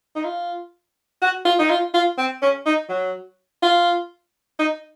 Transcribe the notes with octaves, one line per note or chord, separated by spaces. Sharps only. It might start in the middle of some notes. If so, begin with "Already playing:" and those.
D#4
F4
F#4
F4
D#4
F4
F4
C4
C#4
D#4
F#3
F4
D#4